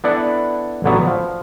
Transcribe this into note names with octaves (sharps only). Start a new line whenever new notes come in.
B3 D4 E4 A4 D5 F#5
A1 D3 F#3 B3 A5
F3